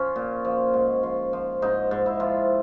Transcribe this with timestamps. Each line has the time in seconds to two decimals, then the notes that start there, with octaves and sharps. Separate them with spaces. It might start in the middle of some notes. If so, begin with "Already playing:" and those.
Already playing: F3 C#4
0.16 A#2
0.45 F3
0.74 G#2
1.03 F3
1.33 F3
1.62 G#2 D#4
1.91 G#2
2.06 E4
2.20 F3